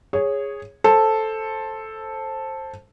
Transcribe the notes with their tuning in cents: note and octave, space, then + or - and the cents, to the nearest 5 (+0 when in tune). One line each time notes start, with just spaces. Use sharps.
G#4 -10 C#5 +0
A4 +0 C5 +15